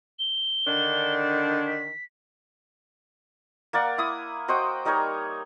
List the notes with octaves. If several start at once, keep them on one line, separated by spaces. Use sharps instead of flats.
G7
D3 D#3 D4
B6
A#3 A#4 D5 F#5
E4 D#6
F#4 C5 D#5 G5
G3 D#4 A#4 C#5